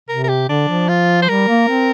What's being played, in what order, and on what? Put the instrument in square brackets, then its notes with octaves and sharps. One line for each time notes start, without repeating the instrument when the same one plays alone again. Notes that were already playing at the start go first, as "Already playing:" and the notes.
[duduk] C3 [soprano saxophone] A#4
[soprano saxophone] A#4
G4
[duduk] D3 [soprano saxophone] D4
[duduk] F3
[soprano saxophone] F4
C5
[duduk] G3 [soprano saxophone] A#4
[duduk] A#3
C4